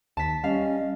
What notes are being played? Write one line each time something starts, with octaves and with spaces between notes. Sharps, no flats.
D#2 A5 B6
G3 C#4 D#5 F5